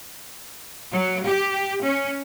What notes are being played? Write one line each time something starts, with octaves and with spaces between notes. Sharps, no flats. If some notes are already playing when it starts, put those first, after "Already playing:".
F#3
G4
C#4